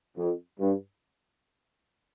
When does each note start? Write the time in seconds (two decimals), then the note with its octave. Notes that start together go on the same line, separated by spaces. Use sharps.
0.18 F2
0.60 G2